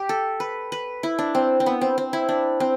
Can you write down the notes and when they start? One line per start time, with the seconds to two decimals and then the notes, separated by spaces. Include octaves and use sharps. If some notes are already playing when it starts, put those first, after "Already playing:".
Already playing: G4
0.09 A4
0.40 B4
0.72 B4
1.03 E4
1.19 D4
1.35 C4
1.60 C4
1.66 B3
1.81 C4
1.98 C4
2.13 E4
2.29 D4
2.60 C4